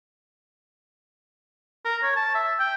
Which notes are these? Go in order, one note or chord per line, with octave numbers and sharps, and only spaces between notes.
A#4
C#5
A5
E5
G5